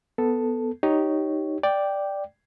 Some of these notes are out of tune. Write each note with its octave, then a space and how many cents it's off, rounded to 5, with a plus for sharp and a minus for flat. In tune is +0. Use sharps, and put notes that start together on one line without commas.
B3 +5 A4 +0
D#4 +0 G4 -15 C#5 +0
D5 +0 G5 +0